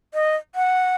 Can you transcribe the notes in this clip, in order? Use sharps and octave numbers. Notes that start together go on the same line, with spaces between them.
D#5
F#5